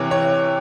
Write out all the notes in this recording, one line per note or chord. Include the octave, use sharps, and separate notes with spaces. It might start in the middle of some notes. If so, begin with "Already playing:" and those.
Already playing: C3 E3 C#5
C#5